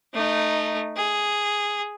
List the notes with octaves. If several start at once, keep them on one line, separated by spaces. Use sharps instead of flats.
A3 D#4
G#4